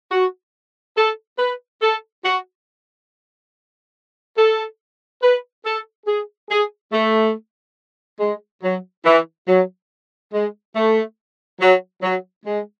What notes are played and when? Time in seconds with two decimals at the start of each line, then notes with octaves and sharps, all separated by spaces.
0.11 F#4
0.96 A4
1.38 B4
1.81 A4
2.23 F#4
4.36 A4
5.22 B4
5.64 A4
6.06 G#4
6.49 G#4
6.92 A3
8.19 G#3
8.62 F#3
9.04 E3
9.48 F#3
10.32 G#3
10.75 A3
11.60 F#3
12.02 F#3
12.45 G#3